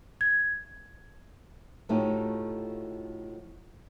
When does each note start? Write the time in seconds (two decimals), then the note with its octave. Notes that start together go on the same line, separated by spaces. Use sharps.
0.21 G#6
1.89 A2 F3 A3 D#4 F#4 G4